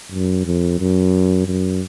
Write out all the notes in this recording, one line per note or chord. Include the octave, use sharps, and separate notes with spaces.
F#2
F2
F#2
F#2